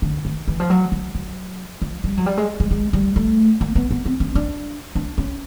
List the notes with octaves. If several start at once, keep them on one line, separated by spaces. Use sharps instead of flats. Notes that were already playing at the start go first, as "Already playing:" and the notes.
D3
D#3
E3
F3
F#3
F#3
F#3
F3
G3
F#3
G3
G#3
G#3
G#3
G3
A3
A#3
B3
B3
C4
C#4
D4
D4
C#4